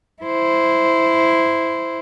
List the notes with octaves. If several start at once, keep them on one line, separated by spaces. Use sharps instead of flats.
E4 C5